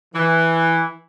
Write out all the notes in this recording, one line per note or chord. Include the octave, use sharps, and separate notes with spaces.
E3